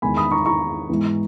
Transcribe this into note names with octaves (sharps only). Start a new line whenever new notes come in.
E2 D#3 G#3 B3 G#5 B5
B5 D#6
A#5 C#6
A#5 C#6
G#2 E3 B3